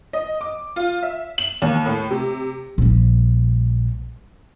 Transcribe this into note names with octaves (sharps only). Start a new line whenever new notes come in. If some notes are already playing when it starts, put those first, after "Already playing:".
D#5
D6
F4
E5
F#7
D#2
A2
C3
A#1 G3